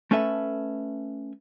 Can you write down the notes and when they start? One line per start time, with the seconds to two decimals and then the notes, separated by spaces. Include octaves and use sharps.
0.11 A3 C#4 A4 B4 E5